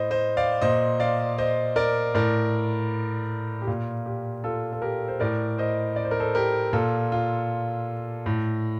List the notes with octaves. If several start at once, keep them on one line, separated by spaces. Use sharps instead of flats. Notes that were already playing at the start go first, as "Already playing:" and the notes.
Already playing: A2 C5 D#5
C5 D#5
D5 F5
A#2 C5 D#5
D5 F5
C5 D#5
A#4 D5
A2 A#4 D5
G4
A#2 F4
G4
F4 A4
A4
G4 A#4
C5
A2 A#4 D5
C5 D#5
D5
C5
A#4
A4 C5
G4 A#4
A#2 F4 A4
F4
A2